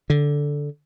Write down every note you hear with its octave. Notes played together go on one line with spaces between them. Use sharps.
D3